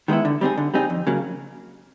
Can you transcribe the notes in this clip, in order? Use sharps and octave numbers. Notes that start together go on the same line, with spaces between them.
D#3 G#3 B3 E4
D3
G3 C4 D#4 G#4
D3
G3 C4 D#4 G#4
F2
C#3 F#3 A#3